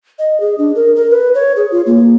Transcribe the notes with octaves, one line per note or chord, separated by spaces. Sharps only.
D#5
G#4
D4
A#4
A#4
B4
C#5
G#4
F4
A#3